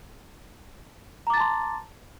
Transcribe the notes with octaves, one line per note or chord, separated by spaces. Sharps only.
A5 A#5 C6 D6 A6